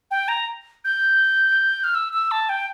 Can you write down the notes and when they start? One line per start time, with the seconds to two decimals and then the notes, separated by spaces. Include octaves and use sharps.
0.11 G5
0.28 A#5
0.84 G6
1.84 F6
1.95 E6
2.13 E6
2.31 A5
2.49 G5